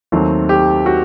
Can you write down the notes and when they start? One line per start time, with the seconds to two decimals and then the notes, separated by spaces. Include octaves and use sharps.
0.12 D#2 D#3 F#3 A3 C4
0.49 G4
0.86 F#4